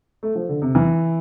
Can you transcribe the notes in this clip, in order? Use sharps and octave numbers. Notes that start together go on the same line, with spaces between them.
A3
F3
D3
C3
E3